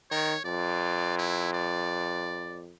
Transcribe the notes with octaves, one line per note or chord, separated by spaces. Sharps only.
D#3 C#5
F2 D5
E4
D5